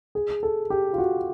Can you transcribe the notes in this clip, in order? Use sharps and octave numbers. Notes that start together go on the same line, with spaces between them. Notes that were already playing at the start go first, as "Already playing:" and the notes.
G#4
A4
G4
F4
F#4